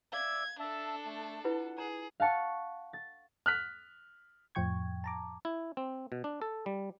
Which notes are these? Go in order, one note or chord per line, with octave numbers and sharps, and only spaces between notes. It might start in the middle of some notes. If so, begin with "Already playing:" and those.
D5 E5 F5 E6 G#6
D4 A4 E5 A5
A3
E4 F4 B4 F#5
G#4 A#5
F5 F#5 A5 C#6
A6
F6 F#6 B6
F2 A2 F3 G5 C#6 G#6
A5 A#5 D6
E4
C4
B2
D4
A4
G3